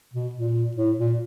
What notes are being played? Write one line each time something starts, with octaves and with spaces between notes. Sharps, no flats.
B2
A#2
A2
A#2